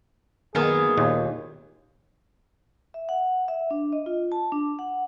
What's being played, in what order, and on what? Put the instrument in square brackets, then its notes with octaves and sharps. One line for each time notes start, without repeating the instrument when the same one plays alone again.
[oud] F#2 A#3 B3 [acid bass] D#3 [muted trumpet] G#4
[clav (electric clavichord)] D#2 [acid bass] A#2
[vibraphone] E5
F#5
E5
D4
D#5
F4
A5
D4
F#5